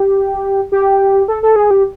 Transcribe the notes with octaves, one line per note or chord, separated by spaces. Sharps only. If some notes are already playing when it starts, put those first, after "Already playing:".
Already playing: G4
G4
A4
A4
G#4
G4